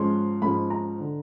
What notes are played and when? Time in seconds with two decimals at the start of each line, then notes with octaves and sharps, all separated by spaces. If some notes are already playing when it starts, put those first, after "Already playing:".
Already playing: G#2 F3 G#3 C#4 C6
0.42 G#2 F3 G#3 C#4 B5
0.70 A#5
1.00 D3